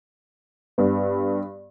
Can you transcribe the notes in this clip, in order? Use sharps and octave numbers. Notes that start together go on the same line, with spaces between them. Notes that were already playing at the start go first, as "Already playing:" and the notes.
G2 B3